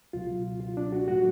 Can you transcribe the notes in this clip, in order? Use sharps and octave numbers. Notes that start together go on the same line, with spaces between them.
C#2 B2 F#3 F4
F4
D4
F#4
A2 F#3 A3 F#4